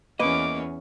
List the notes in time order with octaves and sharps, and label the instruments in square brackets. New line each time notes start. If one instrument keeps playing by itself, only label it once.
[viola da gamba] E2 C#4 [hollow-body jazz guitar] A#3 B4 D#5 [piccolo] D6